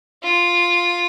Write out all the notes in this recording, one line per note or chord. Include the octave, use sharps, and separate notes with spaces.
F4